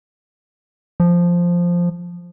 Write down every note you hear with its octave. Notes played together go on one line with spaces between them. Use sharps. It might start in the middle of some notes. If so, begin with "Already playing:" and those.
F3